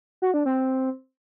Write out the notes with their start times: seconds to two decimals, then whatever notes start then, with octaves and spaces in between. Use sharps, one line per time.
0.22 F#4
0.34 D4
0.46 C4